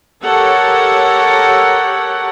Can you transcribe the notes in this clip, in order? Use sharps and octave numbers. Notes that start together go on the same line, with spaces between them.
G4 A4 A#4 C#5 F#5